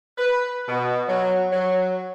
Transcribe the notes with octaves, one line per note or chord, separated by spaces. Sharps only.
B4
B2
F#3
F#3